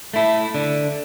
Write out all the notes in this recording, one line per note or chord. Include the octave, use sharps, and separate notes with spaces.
A3 E4 A4
D3